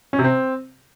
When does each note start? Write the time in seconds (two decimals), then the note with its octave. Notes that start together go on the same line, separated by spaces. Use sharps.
0.13 C#4
0.19 C3
0.24 C4